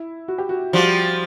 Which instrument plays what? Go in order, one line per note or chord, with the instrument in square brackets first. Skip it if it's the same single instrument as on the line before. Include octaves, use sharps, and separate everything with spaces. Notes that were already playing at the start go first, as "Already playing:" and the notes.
Already playing: [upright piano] E4
F#4
G4
F#4
[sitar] F3 G3 [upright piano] F#4